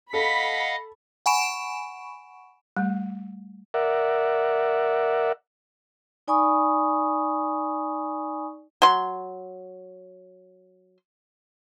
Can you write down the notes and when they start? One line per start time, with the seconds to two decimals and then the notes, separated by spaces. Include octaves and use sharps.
0.13 A4 D#5 F5 F#5 B5 B6
1.26 F#5 G#5 B5 C#6 D7 E7
2.77 G3 A3
3.74 A#4 D5 E5 F#5
6.28 D#4 D5 G#5 B5 C#6 D#6
8.82 F#3 C6